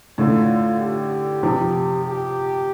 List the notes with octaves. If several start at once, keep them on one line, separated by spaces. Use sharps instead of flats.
A2 D3 F4
G4
C3 F3
G4